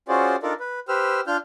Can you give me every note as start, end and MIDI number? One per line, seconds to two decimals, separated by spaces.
0.08 0.36 61
0.08 0.36 65
0.08 0.36 66
0.08 0.36 68
0.08 0.36 72
0.08 0.36 74
0.43 0.53 62
0.43 0.53 63
0.43 0.53 65
0.43 0.53 69
0.43 0.53 70
0.43 0.53 74
0.60 0.80 71
0.88 1.20 67
0.88 1.20 71
0.88 1.20 72
0.88 1.20 88
0.88 1.20 89
1.27 1.37 62
1.27 1.37 65
1.27 1.37 89
1.27 1.37 91